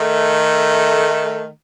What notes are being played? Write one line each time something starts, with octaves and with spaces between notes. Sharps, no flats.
D#3 A3